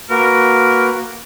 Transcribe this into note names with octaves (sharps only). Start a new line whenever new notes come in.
A#3 F#4 A#4 B4